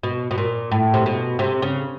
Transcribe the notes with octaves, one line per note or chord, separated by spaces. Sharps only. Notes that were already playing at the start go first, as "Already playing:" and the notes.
B2
B2
A#2
A2
C3
B2
C3
C#3